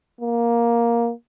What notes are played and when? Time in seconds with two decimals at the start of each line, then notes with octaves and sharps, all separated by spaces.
0.21 A#3